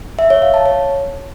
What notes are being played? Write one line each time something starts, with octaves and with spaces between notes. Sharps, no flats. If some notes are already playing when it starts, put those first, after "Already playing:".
E5
C#5
F5
A5
C#5